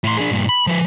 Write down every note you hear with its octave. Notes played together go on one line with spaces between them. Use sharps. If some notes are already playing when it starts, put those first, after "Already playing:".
A2 C6
D4 G#4
G2 A#2
B5
F3 B4